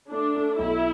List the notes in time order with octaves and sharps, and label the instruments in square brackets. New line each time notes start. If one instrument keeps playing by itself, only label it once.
[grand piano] A3 [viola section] D4
[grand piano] A3
[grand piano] B1 [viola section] E4